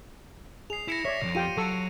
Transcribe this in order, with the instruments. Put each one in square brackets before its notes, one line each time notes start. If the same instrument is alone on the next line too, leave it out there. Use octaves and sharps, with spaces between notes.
[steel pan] G#4 [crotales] C7 F7
[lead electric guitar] E4 [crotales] A#6 C#7 E7
[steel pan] C#5 D5 [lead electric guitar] E5
[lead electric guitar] C2 F2
[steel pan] F4 G4 G5 [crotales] D#7
[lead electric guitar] F#3 [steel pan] A4 C#6 E6